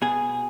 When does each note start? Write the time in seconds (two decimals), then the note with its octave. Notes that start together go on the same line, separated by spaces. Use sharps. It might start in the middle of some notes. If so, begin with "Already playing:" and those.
0.02 B2 G#4